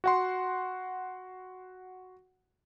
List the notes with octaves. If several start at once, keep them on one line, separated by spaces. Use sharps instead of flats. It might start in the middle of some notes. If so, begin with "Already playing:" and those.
F#4 F#5 C6